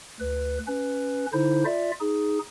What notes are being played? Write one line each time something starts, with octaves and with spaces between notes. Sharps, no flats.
D2 B4
C#4 B4
D3 D#4 E4 C5
F4 D5 E5
D#4 G#4